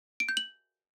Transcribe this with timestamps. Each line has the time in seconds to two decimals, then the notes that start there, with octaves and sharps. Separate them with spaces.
0.20 D7
0.29 G6
0.37 F#7